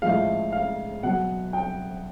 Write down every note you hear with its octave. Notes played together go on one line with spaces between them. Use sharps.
A2 F3 G#3 F5
F5
B2 F#3 F#5
G5